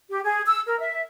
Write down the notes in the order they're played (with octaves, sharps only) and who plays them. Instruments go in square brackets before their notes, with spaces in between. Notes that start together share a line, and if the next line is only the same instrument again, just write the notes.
[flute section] G4
G#4
E6
A#4
E5